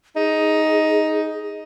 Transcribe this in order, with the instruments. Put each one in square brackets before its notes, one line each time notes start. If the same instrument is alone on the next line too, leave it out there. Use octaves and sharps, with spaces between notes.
[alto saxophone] D#4 [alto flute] G#4